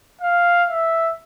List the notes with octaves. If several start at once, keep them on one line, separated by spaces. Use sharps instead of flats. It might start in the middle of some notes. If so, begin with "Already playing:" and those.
F5
E5